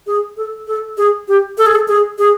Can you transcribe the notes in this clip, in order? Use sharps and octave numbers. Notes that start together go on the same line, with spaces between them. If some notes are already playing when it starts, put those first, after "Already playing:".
G#4
A4
A4
G#4
G4
A4
G#4
A4
G#4
G#4